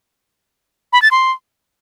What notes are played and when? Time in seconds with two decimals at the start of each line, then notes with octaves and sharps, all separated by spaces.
0.93 B5
1.02 A6
1.11 C6